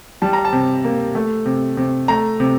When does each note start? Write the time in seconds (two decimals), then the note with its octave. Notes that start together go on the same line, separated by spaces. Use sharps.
0.22 G3 A5
0.33 A#5
0.45 A5
0.53 C3
0.84 A#3
1.15 A3
1.46 C3
1.77 C3
2.08 A3 A#5
2.40 C3